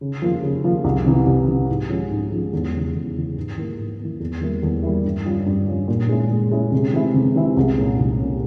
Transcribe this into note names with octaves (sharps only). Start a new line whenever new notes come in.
C#3
F3 A#3 F4
C#3
F3 A#3 F4
C2
C3 E3
C2
C3 E3
G#2
F3 G#3 C#4
G#2
F3 G#3 C#4
E2
C#3 E3
E2
C#3 E3
G#2
E3 A#3
G#2
E3 A#3
E2
E3 G3 A#3 E4
E2
E3 G3 A#3 E4
G2
G3 C#4 F4
G2
G3 C#4 F4
A#2
G#3 C#4 E4
A#2
G#3 C#4 E4
C3
E3 G#3 C4 E4
C3
E3 G#3 C4 E4
C2
A#2 G#3 C#4
C2
A#2 G#3 C#4